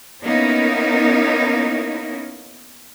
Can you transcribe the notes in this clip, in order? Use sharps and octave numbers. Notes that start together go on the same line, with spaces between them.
A#3 B3 C#4 D#4 E4 A#4